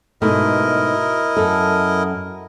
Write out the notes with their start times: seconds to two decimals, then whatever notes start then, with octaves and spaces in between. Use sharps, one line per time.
0.22 G#2 B2 A3 E4 A#4 D#5
1.37 F#2 A4